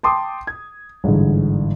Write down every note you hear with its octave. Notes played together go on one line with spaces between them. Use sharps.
G5 A5 C6 D6 D#6
G#6
G1 G#2 D3 E3